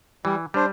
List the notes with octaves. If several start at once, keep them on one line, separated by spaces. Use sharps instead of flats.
E3 G3
G3 D4 C5